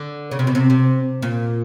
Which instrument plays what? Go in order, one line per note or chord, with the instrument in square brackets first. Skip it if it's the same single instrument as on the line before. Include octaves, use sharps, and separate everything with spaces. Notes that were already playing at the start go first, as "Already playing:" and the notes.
Already playing: [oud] D3
C#3
C3
B2
C3
C3
A#2